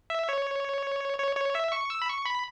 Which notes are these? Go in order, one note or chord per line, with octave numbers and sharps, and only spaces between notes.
E5
C#5
C#5
C#5
E5
C#6
E6
B5
C#6
B5